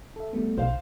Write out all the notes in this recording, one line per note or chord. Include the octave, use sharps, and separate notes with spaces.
A4 E5
G3 A3 B3
B1 C5 F5 G6